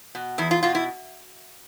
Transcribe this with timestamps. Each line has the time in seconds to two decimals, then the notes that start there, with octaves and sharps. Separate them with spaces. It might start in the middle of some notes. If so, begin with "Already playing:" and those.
0.15 B2
0.38 E2 E4
0.51 F4
0.63 B2 F4
0.75 E4